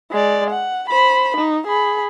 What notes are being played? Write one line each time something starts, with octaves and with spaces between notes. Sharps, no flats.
G#3 D5
F#5
C5 B5
D#4
G#4 B5